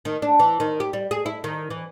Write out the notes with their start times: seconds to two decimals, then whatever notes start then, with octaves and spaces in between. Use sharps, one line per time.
0.05 D#3
0.22 D4
0.39 E3
0.60 D#3
0.80 G4
0.93 G3
1.11 G#4
1.26 E4
1.44 D#3
1.70 E3